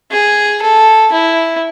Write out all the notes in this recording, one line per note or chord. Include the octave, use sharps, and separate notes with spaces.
G#4
A4
E4